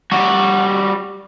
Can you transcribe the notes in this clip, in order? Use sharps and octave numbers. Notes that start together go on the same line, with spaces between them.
G3 F#4